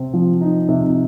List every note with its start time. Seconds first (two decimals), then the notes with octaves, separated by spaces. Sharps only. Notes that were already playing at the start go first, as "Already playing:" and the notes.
Already playing: C3 C4
0.14 F3
0.41 D#4
0.69 C3